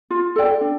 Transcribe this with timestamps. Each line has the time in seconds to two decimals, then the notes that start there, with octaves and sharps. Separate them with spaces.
0.10 F4
0.36 A4 D5 G5
0.61 D4